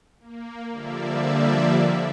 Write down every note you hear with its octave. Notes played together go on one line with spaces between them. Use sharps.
A#3
D3 F3 G3 A#3 D5 E5